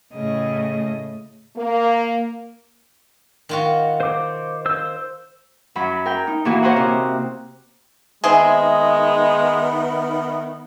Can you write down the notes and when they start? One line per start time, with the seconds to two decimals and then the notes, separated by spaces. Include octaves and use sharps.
0.14 A2 C#3 A3 D#5
1.56 A#3
3.49 D#3 F4 F#4
4.00 C5 D6
4.66 C5 E6 G6
5.75 F#2 F#3 B5
6.06 A#4 G5
6.27 D#4
6.45 A#2 E3 A#3 F#4
6.62 F#4 A#4 C5 C#5 D#5 F#5
6.76 C3
8.24 D#3 G#3 B3 C4 D#4 G#4 B4 E5